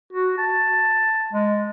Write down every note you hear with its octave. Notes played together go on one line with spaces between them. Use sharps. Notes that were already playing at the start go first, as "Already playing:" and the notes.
F#4
A5
G#3